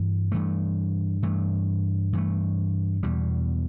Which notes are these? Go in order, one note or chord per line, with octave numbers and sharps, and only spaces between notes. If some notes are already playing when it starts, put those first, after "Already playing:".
Already playing: G2 E3
G2 E3 A3
G2 E3 A3
G2 E3 A3
E2 B2 G3